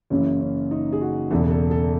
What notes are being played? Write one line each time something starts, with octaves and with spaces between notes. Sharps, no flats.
F#1 F#2 C#3 E3 C#4
C#4
D#4
G#4
F#4
E1 E2 C#3 E3 A4
A4
A4